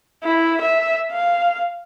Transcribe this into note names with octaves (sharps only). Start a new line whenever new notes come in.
E4
E5
F5